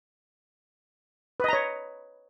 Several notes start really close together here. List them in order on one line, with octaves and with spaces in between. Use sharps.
B4 D#5 A#5 C#5